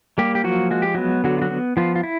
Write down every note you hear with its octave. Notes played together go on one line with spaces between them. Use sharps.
G3 A#3 G4
G4
F3 F#3 F#4
G#3 F#4
G4
F#3 B3 F#4
D3 F#3 F#4
F4
F#3 F#4
B3
F3 B3 F4
F4
E4